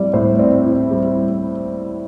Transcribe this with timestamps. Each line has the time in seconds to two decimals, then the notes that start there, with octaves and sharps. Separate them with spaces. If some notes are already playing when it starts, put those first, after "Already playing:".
Already playing: A2 G3 C4 D5
0.13 A2 C5
0.39 C4 D5
0.65 E4
0.91 G3